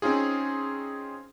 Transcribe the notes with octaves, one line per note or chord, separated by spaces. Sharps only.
C4 C#4 D#4 F4 G#4